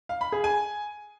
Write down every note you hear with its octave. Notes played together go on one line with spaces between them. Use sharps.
F5
B5
G#4
G#5